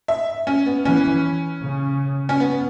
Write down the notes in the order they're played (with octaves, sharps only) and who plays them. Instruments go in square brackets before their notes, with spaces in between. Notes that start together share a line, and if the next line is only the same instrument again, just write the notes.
[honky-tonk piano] E5
C#4
B3
[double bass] E3 [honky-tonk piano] C#4
[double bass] C#3
[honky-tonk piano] C#4
B3